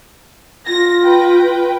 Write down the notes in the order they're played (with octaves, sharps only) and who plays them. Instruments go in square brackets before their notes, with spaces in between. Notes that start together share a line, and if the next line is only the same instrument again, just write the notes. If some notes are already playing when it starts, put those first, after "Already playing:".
[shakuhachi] F4 [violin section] A#6
[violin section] B4 G5